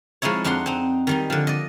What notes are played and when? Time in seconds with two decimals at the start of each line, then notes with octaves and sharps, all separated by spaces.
0.22 F3 G#3 D#4 E4 C#5
0.44 F2 D4 D#4 F#5 C6
0.66 C4 D#4
1.07 D#3 G3 D#4
1.30 D3 F3
1.47 D5 D#5